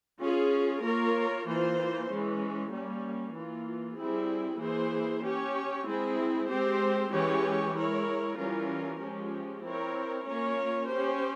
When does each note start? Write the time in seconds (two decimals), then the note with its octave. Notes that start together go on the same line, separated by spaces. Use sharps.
0.21 C#4 F4 G#4
0.83 A#3 F4 A#4 C#5
1.46 E3 A#3 F4 C5
2.09 E3 G#3 C#4
2.72 G3 A#3 C#4
3.34 E3 A#3 F4
3.97 G3 C4 E4 G#4
4.60 E3 A#3 E4 G#4 C5
5.23 C#4 G4 C#5
5.86 G#3 C4 E4 G#4
6.49 G#3 C4 G4 C5
7.12 E3 G#3 C#4 G4 C#5
7.74 G#3 E4 A#4 C#5
8.37 E3 G3 C#4 F4 A#4
9.00 F3 G#3 C#4 G4
9.63 C4 E4 A#4 C#5
10.26 A#3 C#4 F4 A#4 C#5
10.88 C#4 G4 C5